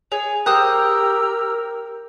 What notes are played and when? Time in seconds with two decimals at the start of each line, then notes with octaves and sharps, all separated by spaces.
0.12 G#4 C#5
0.46 G4 A#4 C5 G5 A#5 D#6 E6 F#6